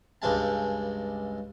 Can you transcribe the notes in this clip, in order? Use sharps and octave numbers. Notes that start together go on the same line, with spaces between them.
C#2 G2 G#3 G#5 A5